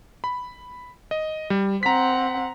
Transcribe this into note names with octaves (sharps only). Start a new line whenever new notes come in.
B5
D#5
G3
C4 F#5 A#5 B6